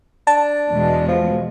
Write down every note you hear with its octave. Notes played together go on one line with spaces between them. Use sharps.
D4 A5
E2 B2 G#3
F3